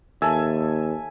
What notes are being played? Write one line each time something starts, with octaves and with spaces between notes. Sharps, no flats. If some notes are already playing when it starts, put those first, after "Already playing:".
D#2 A4 E5 G#5